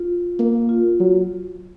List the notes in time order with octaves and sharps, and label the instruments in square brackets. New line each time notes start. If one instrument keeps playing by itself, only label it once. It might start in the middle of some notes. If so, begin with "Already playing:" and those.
Already playing: [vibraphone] F4
[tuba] A#3
[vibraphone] F4
[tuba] F#3